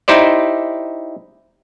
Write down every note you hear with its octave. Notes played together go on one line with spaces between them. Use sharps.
D#4 E4 G4 C5 D5